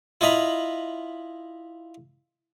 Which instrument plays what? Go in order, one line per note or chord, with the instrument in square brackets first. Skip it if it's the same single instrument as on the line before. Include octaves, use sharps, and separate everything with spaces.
[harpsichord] E4 F4 D#5 A#5 B5